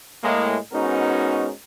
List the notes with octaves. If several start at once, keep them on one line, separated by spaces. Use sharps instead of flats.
A2 G#3 A#3
G#2 B3 C#4 D#4 F#4 A#4